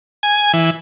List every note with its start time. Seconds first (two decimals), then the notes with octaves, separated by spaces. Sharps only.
0.23 G#5
0.53 E3